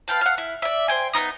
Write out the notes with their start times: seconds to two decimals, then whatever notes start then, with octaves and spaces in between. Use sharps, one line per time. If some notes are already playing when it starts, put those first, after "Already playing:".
0.08 B4 F5 G5 A5
0.21 F5 F#5
0.38 E4
0.62 D5 E5
0.88 C5 G5 G#5
1.13 B3 C4 D#4 D#6